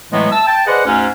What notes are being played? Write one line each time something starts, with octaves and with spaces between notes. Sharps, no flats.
A2 E3 F#3 G#3 A3 B3
E5 A5 E6
G5 A5
G#4 B4 C5 D5 D#5 F#5
D2 G#2 C#4